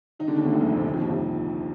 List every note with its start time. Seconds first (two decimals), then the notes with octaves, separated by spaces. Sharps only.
0.19 D#3 D#4
0.27 D3 D4
0.36 D#2 D#3
0.44 D2 D3
0.53 C2 C3
0.61 A#1 A#2
0.69 F2
0.77 A#1 A#2
0.84 D#2 D#3
0.93 F2 F3
1.01 D#2 D#3
1.09 C2 C3